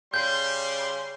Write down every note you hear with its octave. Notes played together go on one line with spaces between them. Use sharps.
C#3 G3 C6 G6